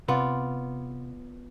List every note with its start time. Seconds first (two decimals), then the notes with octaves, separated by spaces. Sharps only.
0.08 C3 B3 F4 D5